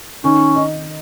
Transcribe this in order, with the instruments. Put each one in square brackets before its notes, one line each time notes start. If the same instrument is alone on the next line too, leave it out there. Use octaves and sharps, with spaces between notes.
[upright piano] D#3 [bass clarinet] C#4
[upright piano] D#4